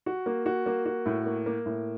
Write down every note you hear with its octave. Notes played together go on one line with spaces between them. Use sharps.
F#4
A#3
F#4
A#3
F#4
A2
A#3
A#3
A2